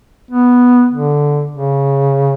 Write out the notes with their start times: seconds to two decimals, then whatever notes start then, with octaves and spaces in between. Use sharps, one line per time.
0.31 B3
0.92 D3
1.51 C#3